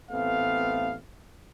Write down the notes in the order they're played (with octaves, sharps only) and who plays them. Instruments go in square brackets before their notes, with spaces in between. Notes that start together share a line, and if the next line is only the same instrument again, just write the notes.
[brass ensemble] A1 A3 B3 C4 F5